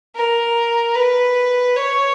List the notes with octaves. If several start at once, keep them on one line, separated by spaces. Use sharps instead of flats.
A#4
B4
C#5